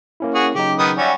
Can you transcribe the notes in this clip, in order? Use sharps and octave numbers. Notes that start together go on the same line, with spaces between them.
A#3 C#4 E4
F#4 G#4
C#3 F#3 D#4 G4
D#3 B3 D#6
G3 C#4 F#4 D5 E5